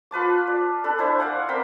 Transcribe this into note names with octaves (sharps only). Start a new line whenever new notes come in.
F4 B4 A5 D6
D5
D4 A4 B4
D4 E4 C5 G#5
D5 F5 F#5 G#5
C4 A#4 G5 B5